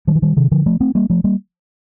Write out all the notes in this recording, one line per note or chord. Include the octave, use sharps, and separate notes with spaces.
D#3 G3
F3
D#3 G3
C3 D#3
D3 F3
F3 A3
A3 C4
G3 A#3
F3 A3
G3 A#3